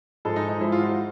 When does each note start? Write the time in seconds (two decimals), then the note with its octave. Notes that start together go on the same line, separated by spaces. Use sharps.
0.25 G#2 F3 G#3 A4
0.36 D#4
0.49 D#4
0.60 G#2 F3 G#3 E4
0.72 F4
0.79 F#4
0.84 F4